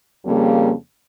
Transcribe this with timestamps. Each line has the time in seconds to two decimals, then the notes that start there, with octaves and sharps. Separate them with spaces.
0.24 F2 C#3 G3 A#3